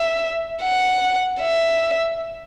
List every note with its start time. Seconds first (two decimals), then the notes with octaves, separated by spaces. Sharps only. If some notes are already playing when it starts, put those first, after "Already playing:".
Already playing: E5
0.63 F#5
1.40 E5